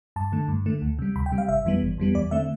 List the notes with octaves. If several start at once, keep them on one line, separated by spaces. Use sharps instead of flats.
G2 A5
D3 A3
G2
D3 A3
D2
C3 G3
D2 B5
G5
C3 G3
F5
G1 E5
F2 E3 G3 B3
G1
F2 E3 G3 B3
E2 D5
D3 A3 C4 E5